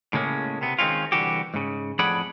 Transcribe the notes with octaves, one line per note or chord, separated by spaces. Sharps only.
A2 C#3 G#3 A#3 C#4
C3 B3
D#3 G#3 C4 C#4 F4
C2 D3 E3 F#4 G4
G#2 C#3
F2 A2 G#4 D5 F#5 B5